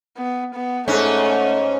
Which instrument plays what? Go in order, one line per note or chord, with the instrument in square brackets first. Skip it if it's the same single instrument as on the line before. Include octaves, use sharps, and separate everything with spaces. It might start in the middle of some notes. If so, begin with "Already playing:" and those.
[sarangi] B3
B3
[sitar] G#2 C#4 [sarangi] A3